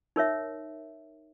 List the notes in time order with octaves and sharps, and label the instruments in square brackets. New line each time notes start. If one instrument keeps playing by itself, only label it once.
[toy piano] D#4 A#4 C#5 E5